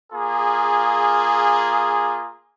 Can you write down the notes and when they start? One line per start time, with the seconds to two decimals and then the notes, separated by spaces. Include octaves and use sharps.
0.13 A#3 F4 G#4